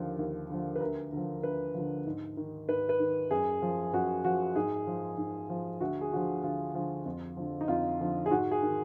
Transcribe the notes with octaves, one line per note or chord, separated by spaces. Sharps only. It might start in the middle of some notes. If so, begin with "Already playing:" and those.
Already playing: D#2 D3 F3
D#2
D3 F3
B4
D2 A#4
D3 F3
D2 B4
D3 F3
G#2
D#3
G#2 B4
B4
D#3
F#2 G#4
F3
F#2 F#4
F3 F#4
G#2 G#4
F3
G#2
F3
D2 F#4
G#4
D3 F3 F#4
D2 F4
D3 F3
F2
D3 F3
D#4
F2 F4
D3 F3
G#4
G#2 F#4
G#4
D#3